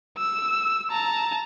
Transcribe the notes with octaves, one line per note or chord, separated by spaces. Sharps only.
E6
A5 A#5